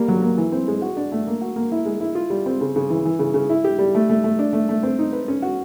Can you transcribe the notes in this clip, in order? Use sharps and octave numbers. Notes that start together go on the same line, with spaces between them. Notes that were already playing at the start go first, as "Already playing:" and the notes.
Already playing: G3 A#3
F#3
A#3
E3
C4
G#3
F#4
D4
A3
A#3
F#4
A#3
E4
G#3
E4
F4
G3
C4
C#3
C#3
E3
E3
C#3
C#3
E4
G4
G3
A3
A3
A3
D4
A3
A3
C4
D#4
B4
C#4
F#4